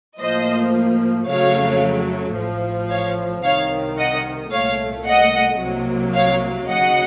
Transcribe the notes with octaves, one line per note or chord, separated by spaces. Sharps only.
A2 F3 A#3 C5 D#5
F2 C#3 F#3 A3 C#5 F5
A1 A2 F3
C#5 F5
C2 C3 D#3 C#5 F5
D#5 F#5
C2 A#2 A3 C#5 F5
D#5 F#5
C2 C3 F#3 A#3
C#5 F5
D#2 C#3 F#3 D#5 F#5